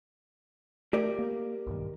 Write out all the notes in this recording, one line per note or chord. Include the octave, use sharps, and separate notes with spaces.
A3 G4 A#4 D5
A#3
B1 G2 D#3